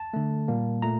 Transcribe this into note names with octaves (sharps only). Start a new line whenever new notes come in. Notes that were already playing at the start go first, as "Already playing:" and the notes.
Already playing: A5
D3 A3
A#2 G3 A#3
A#2 A3 A#5